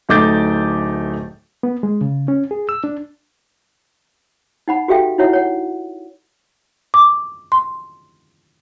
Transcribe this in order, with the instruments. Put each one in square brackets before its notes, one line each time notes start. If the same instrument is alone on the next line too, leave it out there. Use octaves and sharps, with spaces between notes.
[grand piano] D1 A3 D#4 D6 G6 A6
[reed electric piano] B3
G#3
C#3
C#4
G#4
E6
D4
[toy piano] D#4 F#5 B5
F#4 G4 A4 E5 F5 G5
D#4 E4 F#4 C#5 E5 F#5
C#5 F#5
[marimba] D6
C6